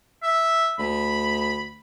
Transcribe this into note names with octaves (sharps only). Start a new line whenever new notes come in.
E5
D2 B5